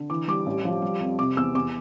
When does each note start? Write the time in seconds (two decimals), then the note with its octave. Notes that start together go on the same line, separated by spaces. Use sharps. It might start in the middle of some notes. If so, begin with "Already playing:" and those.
Already playing: D3
0.10 E3 D6
0.28 G3 D6
0.46 A1
0.65 F3
0.82 G3
1.00 F2
1.18 C3 D6
1.37 E2 E6
1.55 E2 D6